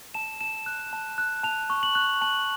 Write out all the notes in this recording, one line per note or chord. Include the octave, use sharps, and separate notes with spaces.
A5 E7
A5 E7
F#6
A5
F#6
A5 F7
C#6
F#7
F#6
A5 F#7